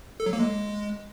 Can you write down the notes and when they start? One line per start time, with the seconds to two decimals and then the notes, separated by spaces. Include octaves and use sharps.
0.20 A4
0.26 F#3
0.33 A#3
0.39 G#3